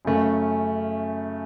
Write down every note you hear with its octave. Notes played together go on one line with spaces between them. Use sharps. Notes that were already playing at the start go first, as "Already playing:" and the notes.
F#2 C#3 A3 C#4